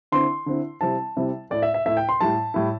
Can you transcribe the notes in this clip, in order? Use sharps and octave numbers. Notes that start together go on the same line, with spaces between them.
D3 C4 E4 C6
D3 C4 E4
C3 G3 C4 E4 A5
C3 G3 C4 E4
A2 A3 E4 D5
E5
E5
A2 A3 E4 E5
G5
C6
A2 G3 E4 A5
A2 G3 E4